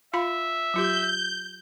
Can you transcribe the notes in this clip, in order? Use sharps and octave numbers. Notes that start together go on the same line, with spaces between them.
F4 E5 F5 B5
F#3 F4 G4 G6